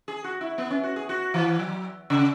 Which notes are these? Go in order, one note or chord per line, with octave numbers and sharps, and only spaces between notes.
G#4
F#4
E4
B3
C#4
F#4
G#4
F#4
E3
F#3
C#3